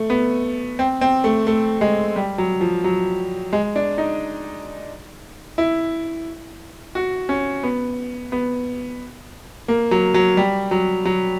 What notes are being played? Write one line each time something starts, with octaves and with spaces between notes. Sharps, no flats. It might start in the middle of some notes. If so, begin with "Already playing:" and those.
Already playing: A3
B3
C4
C4
A3
A3
G#3
G3
F#3
F3
F#3
G#3
D4
D#4
E4
F#4
C#4
B3
B3
A#3
F#3
F#3
G3
F#3
F#3